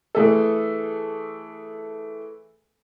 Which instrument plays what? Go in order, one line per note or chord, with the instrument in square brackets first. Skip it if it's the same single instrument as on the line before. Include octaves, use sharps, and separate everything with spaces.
[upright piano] E3 A3 G#4 A4